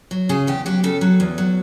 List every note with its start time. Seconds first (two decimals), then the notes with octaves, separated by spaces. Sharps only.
0.11 F#3
0.29 C#3 G#4
0.47 E2 G4
0.66 F#3 G4
0.83 C#3 A4
1.01 F#3
1.20 E2
1.38 F#3